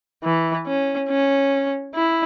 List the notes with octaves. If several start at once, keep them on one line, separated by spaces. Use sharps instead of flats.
E3
C#4
C#4
E4